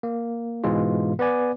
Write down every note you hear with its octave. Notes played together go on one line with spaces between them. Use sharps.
A#3
G#2 B2 E3 G#3 F4
B3 B4 D5 G#5